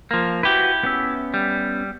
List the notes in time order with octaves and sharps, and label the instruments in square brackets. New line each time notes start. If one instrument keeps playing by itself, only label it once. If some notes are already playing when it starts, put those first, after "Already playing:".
[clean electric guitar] F3 A#3
[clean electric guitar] E4 G4 [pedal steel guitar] F#4 B4
[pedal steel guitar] B3 C#4 E5
[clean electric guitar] G3